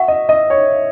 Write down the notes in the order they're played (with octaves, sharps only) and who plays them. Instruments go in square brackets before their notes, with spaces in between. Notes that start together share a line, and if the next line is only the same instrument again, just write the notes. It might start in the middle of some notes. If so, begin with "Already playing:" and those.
Already playing: [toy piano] F#4 F#5 C#6 [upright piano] E5
[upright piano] D#5
D#5
C#5